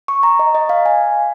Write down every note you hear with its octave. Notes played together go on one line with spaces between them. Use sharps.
C#6
A#5
D#5
D#5
F5
G#5